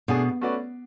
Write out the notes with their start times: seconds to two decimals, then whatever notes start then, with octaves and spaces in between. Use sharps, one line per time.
0.08 B2 A3 D4 G#4 D5
0.41 A3 C#4 F#4 B4 D5